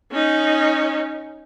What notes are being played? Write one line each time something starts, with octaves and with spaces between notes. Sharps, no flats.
C#4 D#4